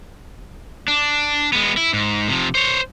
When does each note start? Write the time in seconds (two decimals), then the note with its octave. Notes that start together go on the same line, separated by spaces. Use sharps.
0.88 D4
1.53 G#3 B3
1.77 E4
1.93 G#2
2.28 C3 F3
2.55 C5 C#5